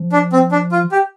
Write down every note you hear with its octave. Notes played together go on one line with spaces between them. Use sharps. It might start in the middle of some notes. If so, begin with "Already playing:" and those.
Already playing: F3
D4
C4
D4
F4
G4